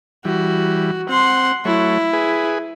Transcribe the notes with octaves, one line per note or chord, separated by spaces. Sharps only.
E3 G3 F#4
C4 F#5 C6
F#3 A3 E4 C#5
G#4 B4